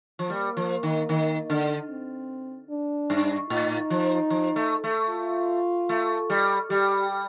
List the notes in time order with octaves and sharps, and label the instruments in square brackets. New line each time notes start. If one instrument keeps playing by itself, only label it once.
[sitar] F3
[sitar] G3 [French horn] A#3
[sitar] F3
D#3
D#3
D3
[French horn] C4
D4
[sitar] G2
[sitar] A2 [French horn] D#4
[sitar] F3
F3
A3
A3
[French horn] F4
[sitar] A3
G3
[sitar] G3 [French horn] G4